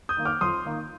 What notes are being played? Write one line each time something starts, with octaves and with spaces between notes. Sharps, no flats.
D#6 G6
D#3 A#3
D6 F6
F2 C6 D#6
D#3 A#3